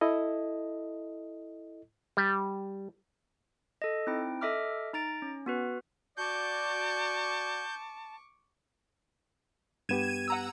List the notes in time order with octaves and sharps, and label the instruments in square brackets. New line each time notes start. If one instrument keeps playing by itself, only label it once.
[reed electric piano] E4 A4 D#5
[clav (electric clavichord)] G3
[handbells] A4 D#5
C4 D#4 E4 G5
A4 D#5 E5 D6 F6
D#4 A#5 A6 D7
C#4
B3 F#4 B4
[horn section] F#4 D5 [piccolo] A5 [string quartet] C#6 D6 [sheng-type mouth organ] G6
[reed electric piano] G2 B3 G4 [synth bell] G#6 D#7 E7
[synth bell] F#5 A#5 E6